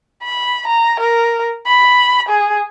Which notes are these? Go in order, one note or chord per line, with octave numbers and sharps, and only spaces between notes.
B5
A#5
A#4
B5
G#4